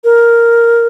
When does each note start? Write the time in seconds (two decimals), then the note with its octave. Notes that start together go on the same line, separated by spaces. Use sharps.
0.04 A#4